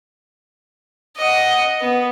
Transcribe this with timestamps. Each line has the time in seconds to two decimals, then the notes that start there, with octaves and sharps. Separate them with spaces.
1.18 D#5 F#5
1.81 B3